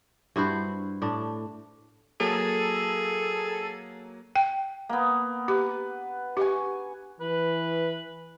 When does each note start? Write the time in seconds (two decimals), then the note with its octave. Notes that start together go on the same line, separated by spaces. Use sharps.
0.36 G2 E4 F#4 C5
1.02 A2 D4
2.20 F#3 A#3 G#4 A4
4.36 G5
4.89 A#3 B3
5.48 G4 B4
6.37 G4 G#5 C#6
7.21 E3 B4